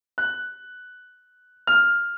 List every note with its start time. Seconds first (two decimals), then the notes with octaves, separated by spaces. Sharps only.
0.18 F#6
1.67 F6